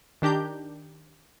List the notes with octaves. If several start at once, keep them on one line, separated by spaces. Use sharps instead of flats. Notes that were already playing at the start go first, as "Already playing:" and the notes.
D#3 D4 G4 A#5 G6